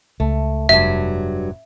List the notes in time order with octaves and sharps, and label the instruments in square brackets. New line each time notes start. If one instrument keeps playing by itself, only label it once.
[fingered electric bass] C#2 [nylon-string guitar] A3
[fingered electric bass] F1 [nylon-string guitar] G2 F#3 [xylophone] E5